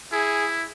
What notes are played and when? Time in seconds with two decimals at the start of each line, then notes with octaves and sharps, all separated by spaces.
0.13 E4 G#4